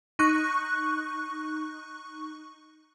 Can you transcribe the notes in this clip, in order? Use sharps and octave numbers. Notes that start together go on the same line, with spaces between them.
D#4 C#6 F#6